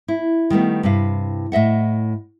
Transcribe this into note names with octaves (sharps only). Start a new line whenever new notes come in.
E4
D#3 G3 A3 B3
G2 C3 E4 F5
A2 D#5 E5 F#5